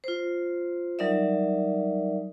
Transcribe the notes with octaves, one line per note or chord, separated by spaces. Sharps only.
F4 C5
F#3 G3 D#4 A#4 D5 E5